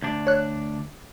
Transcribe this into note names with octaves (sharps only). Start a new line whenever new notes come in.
D2 D4
C#5 F#6